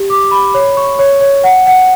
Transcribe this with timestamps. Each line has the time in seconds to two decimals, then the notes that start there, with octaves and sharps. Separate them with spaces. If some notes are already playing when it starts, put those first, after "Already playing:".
Already playing: G4
0.10 D6
0.31 B5
0.54 C#5
0.77 C#6
0.99 C#5
1.21 C#5
1.44 F#5
1.67 F#5